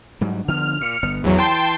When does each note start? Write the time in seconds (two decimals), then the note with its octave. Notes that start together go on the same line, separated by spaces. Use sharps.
0.21 G#2 F#3 G3
0.48 D3 F3 B3 F6
0.81 A#2 F6 C#7
1.03 G1 B3
1.24 G#1 E2 C3 F#3
1.38 E3 G5 A5 C6